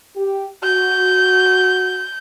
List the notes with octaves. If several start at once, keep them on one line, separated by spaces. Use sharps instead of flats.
G4
F#4 G6